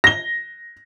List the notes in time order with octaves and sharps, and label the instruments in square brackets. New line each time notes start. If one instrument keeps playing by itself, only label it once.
[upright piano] A#6 G7